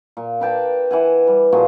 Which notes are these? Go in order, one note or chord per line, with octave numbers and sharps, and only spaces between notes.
A#2
D4 B4 G5 A5
E3 F#5 G#5
G3
A#2 F3 F#4 G#4